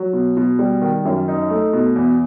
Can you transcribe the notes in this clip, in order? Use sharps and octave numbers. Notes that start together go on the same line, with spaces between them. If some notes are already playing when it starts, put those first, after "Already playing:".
Already playing: F#3
B2
B2
G3
D#3
F#2
D#4
A3
B2
E2